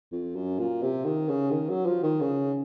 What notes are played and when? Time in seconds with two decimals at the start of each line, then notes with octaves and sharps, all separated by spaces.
0.12 F2
0.35 F#2
0.59 A#2
0.82 C3
1.05 D#3
1.28 C#3
1.51 D#3
1.69 F#3
1.86 F3
2.03 D#3
2.20 C#3